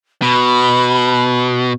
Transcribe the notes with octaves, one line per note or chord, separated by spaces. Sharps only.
B2 B5